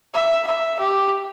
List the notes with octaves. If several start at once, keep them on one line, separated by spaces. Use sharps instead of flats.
E5
E5
G4